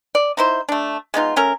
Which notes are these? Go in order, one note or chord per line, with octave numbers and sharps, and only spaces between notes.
D5
D#4 E4 C5
A3 D4
G#3 B3 D#4 F4
A3 C#4 A#4